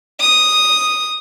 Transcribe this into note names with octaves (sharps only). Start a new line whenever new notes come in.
D#6